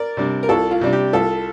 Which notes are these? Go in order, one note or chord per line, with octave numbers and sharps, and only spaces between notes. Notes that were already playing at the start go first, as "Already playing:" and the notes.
Already playing: A#4 D5
C3 G3 D4
A#4
C2 F4 A4
F4
C3 G3 D4
G4
C2 F4 A4